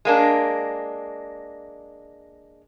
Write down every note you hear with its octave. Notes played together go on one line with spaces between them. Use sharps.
G#3 A#3 D4